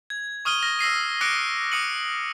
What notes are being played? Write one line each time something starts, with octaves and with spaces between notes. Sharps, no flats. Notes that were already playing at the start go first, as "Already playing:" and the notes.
G#6
C#6 D#6 F6 D#7 G7
F6 A#6
E6 A#6 C7 D#7
D6 F#6 A#6 C#7 D7
D6 D#6 C#7 D#7 F#7